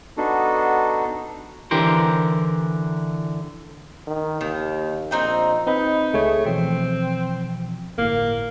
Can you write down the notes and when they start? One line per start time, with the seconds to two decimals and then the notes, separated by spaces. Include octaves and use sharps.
0.17 B3 D4 D#4 F#4 A4
1.71 D3 E3 G4 A#4 C5
4.07 D#3
4.41 D#2 D#3
5.11 A#1 C4 D#4 G5
5.67 C4 D#4 B4 B5
6.14 C#2 A3 G#4 C#5
6.46 B2 E3 F3 C4
7.98 G1 A2 A#3